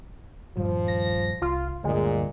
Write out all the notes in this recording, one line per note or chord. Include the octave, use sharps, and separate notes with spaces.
D#1 G2 F3 G3
A#6
C2 F4
D2 G2 A#2 G#3